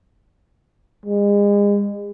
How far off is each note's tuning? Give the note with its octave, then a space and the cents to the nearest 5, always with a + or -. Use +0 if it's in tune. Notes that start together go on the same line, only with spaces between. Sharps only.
G#3 -35